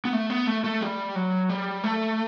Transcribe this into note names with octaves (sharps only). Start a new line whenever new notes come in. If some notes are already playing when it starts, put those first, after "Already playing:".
B3
A3
B3
A3
A3
G3
F#3
G3
A3